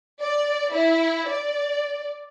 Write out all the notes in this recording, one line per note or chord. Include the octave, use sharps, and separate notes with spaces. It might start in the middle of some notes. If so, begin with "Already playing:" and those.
D5
E4
D5